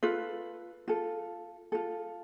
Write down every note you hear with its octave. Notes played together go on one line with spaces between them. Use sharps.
F4 A4 B4
F4 A4
F4 A4